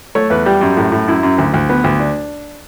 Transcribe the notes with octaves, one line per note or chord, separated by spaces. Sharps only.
A3 C#5
E2 B4
G3 G4
F#2
A2
A2
F#2 E4
F#2
D2
D2
B3
D2
D4